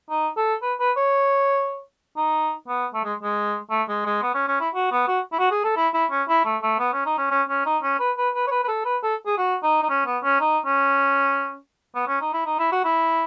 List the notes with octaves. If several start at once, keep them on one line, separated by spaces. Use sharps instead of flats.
D#4
A4
B4
B4
C#5
D#4
B3
A3
G#3
G#3
A3
G#3
G#3
B3
C#4
C#4
E4
F#4
B3
F#4
E4
F#4
G#4
A4
E4
E4
C#4
E4
A3
A3
B3
C#4
D#4
C#4
C#4
C#4
D#4
C#4
B4
B4
B4
C#5
B4
B4
A4
B4
A4
G#4
F#4
D#4
D#4
C#4
B3
C#4
D#4
C#4
B3
C#4
D#4
E4
D#4
E4
F#4
E4